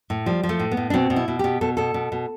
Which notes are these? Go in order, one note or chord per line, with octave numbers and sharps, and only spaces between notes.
A2
F3 G3
F3
A3
A2
B3
A2
D4
B2 C4
B2
E4
B2
B2 G4
B2 A4
B2 A4
B2
B2